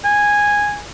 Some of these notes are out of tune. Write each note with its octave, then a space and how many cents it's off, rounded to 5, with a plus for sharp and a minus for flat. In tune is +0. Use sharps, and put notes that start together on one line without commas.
G#5 -10